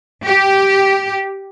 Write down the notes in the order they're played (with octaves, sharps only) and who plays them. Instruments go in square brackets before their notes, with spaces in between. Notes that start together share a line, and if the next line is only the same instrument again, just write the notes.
[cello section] G4